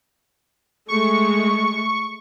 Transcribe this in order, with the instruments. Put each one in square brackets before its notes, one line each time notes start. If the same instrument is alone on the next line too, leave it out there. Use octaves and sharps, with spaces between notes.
[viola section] G#3 A3 [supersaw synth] C#6